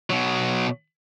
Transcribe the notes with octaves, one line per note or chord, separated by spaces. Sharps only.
B2 F#3